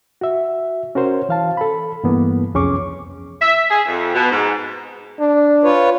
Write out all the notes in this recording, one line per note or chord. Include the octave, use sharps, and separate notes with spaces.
F#4 E5
C#4 F#4 A#4 C5 C#5
E3 F5 A5
A4 B5
G2 E3 A#3 B3
C2 F2 C#4 G#4 C#6 D6
E5
G#4
F2
B2
G#2
D4
F4 B4 C#5